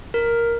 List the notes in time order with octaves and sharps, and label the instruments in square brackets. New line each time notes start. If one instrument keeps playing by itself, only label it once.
[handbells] A#4